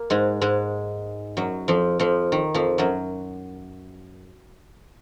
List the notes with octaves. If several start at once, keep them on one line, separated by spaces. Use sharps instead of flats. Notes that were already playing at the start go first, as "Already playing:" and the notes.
Already playing: A#3
G#2 G#3
G#2 G#3
F#2 F#3
F2 F3
F2 F3
D#3
F2 F3
F#2 F#3